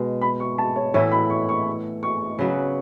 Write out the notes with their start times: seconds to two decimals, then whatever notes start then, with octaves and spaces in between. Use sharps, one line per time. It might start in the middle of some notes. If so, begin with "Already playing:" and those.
Already playing: B2 G#3
0.21 B5
0.40 C#6
0.58 A5
0.76 C#5
0.94 A2 E3 B3 E4 C#5
1.12 B5
1.30 C#6
1.49 C#6
2.03 C#6
2.39 C#3 F#3 B3 F#4